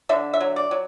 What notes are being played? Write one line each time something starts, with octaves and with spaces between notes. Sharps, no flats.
D3 E5
E5
F#3
D5
F#3